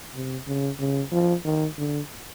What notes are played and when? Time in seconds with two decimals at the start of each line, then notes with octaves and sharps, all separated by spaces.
0.15 C3
0.47 C#3
0.79 C#3
1.12 F3
1.45 D#3
1.77 D3